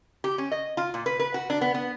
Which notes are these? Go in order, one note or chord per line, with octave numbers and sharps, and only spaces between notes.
G4
C#4
D#5
F4
A#2
B4
B4
F#4
D4
B3
B3